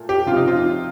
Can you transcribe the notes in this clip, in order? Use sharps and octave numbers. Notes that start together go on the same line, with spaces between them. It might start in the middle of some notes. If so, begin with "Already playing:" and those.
Already playing: A#2 A3
G4
C3 F3 C4 F4
D#4
F4